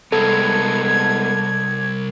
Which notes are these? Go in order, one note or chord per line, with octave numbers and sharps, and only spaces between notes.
C2 G#3 B3 A4 A5 G#6